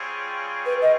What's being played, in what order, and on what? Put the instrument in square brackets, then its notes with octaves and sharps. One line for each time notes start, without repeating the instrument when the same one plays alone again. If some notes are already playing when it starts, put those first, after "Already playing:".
Already playing: [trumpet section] G3 C4 F4 G#4 C#5
[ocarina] B4
D#5